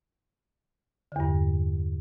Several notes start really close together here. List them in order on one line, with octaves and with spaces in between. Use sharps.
D3 E2 G2